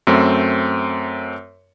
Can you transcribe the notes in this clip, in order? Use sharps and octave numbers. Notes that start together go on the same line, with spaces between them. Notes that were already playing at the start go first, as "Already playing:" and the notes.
F#2 A3 C4